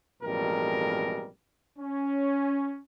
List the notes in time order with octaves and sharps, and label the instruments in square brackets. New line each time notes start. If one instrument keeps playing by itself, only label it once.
[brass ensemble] A1 F2 B2 G3 G#3 A#4
C#4